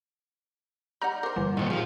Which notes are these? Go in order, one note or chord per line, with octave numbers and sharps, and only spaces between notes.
G3 D#4 F#5 A#5 G6
A#4 C5 D6
G1 E3 G3
A#2 D#3 A3 C4
F3 F4 G4 G#4